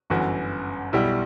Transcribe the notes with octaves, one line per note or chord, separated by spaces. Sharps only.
G1 F#2 E3 F#4
B1 B2 G3 E4